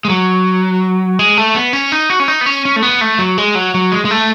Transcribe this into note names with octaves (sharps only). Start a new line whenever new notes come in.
G#3
F#3
G#3
A3
B3
C#4
D#4
F#4
C#4
D#4
B3
C#4
C#4
A3
B3
A3
F#3
G#3
F#3
F#3
G#3
G#3
A3